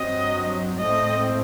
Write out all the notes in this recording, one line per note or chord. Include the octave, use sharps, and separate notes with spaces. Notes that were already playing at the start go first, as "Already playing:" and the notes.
Already playing: G2 F#3 C4 D#5
A2 A3 C4 D#5